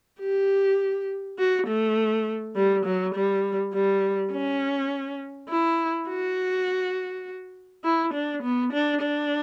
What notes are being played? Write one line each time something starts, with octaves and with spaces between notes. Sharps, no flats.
G4
F#4
A3
G3
F#3
G3
G3
C#4
E4
F#4
E4
D4
B3
D4
D4